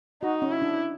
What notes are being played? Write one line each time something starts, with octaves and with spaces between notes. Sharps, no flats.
D#4 F#4
C#4
E4
D4